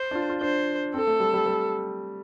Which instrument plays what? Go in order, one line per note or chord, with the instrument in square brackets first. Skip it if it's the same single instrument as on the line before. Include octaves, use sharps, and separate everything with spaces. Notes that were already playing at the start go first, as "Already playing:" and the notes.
Already playing: [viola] C5
[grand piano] D4
F4
F4
[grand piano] D4 [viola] C5
[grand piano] C4 [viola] A4
[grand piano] A3
G3
G3
G3